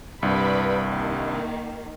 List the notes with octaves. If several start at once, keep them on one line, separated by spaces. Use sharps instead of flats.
C2 G2 B4 D5 B5
D#3 A#3